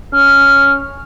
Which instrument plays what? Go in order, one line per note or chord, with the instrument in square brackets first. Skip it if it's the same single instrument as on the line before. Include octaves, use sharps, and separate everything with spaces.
[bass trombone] C#4 [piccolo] F6